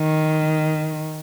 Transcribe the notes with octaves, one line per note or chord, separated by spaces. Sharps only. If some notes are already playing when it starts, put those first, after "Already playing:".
Already playing: D#3